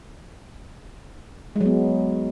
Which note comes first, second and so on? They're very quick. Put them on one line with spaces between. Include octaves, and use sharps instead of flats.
G#3 F#3 B3